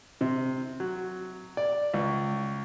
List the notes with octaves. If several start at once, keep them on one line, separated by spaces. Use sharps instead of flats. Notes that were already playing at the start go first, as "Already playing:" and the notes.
C3
F#3
D5
C#2